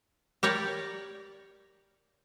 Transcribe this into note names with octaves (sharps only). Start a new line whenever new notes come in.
G4 A#4 C#5 D5